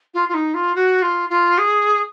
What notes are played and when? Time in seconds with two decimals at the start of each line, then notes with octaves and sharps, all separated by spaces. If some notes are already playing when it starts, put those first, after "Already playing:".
0.14 F4
0.29 F4
0.34 D#4
0.54 F4
0.75 F#4
1.02 F4
1.30 F4
1.58 G#4